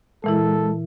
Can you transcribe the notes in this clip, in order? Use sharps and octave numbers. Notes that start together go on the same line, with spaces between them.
A#2 E3 G#3 E4 A4